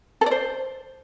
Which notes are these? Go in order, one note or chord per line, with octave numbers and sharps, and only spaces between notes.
A4
D5
C5